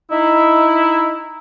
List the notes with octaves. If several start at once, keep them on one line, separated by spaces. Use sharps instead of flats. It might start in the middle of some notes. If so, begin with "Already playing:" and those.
D#4 E4